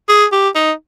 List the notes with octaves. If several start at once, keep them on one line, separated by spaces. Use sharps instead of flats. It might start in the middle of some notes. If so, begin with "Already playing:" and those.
G#4
G4
D#4